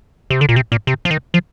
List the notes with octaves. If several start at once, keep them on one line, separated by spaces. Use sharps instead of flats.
C3
D3
A#2
C3
A#2
C3
F3
D#3
F3